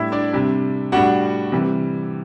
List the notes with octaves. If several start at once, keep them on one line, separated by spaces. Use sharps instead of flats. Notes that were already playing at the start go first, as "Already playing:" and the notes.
Already playing: A2 G3 D4 E4 E5
D4 D5
C3 G3 D4
A2 G3 D4 F#4 F#5
C3 E3 G3